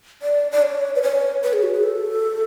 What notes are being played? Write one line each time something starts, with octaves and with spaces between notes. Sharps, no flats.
D5
D5
C#5
B4
C#5
B4
G#4
F#4
G#4
A4